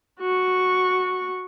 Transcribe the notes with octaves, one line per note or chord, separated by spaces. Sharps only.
F#4 C#6